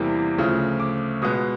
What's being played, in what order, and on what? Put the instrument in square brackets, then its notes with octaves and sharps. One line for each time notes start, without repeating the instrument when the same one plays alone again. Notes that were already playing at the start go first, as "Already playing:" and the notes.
Already playing: [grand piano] E2 C3 E3 G3 A#3
D2 C#3 F3
D6
B2 G#3 B3 D#6